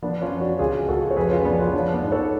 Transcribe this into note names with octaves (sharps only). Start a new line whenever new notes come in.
F3 B3 D4
C#4 F4
F2
D4 F#4
C#2 F4 G#4
C#2 F#4 A4
C#5
F2 G#4 B4
C#4 F4
F2 B3 D4
C#4 F4
F3 B3 D4
B3 D4
G#2
A4 C#5